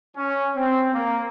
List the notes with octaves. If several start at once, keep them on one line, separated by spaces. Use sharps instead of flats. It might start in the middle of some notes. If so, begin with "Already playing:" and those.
C#4
C4
A#3